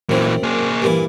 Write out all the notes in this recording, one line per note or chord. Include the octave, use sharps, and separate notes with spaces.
F#2 A#2 E3 C4
A#3 G#4
G2 A#2 E3